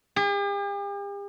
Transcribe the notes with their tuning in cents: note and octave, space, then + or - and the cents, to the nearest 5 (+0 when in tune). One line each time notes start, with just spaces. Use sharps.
G4 +45